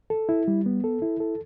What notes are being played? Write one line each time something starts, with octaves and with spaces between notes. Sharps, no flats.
A4
E4
G3
B3
A4
E4
A4